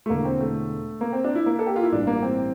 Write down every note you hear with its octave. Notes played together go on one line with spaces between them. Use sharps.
A3
E1 E2 D3 A#3
C4
A3
A#3
C4
D4
E4
A#3
A4
G4
F4
E4
A1 G2 E3 D4
A#3
C4